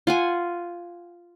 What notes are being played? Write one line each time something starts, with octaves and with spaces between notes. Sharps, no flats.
F4 F#5 G#5